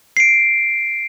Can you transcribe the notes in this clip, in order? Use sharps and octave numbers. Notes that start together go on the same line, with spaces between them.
C7 D7